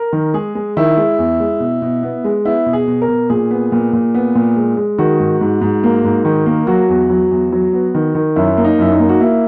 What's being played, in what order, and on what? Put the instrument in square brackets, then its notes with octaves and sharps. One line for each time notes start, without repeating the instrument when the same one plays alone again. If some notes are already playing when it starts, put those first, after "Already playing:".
Already playing: [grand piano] A#4
D#3
G#3 G#4
G#3
D#3 E4
G#3
E2
G#3
B2
B2
B3
G#3
B3 E4
B2
G#4
B2
A#4
B2
A#2 G#4
B3
A#2
A#2
B3
A#2
G#3
G#3
D#3 F#4
G#2
G#2
G#2
A#3
G#2
D#3
A#3
F#3 F#4
E2
F#3
E2
F#3
B3
D#3
D#3
F#2 E4
A#3
D#4
F#2 E4
D#4
A#3
F#4
A#3 E4